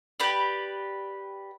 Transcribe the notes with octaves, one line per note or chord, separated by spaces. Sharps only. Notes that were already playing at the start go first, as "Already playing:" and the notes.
G4 B4 D5